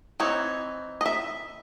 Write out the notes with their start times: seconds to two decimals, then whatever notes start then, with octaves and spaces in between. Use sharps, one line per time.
0.20 E3 C4 D#4 C#5
1.01 D#5
1.06 E5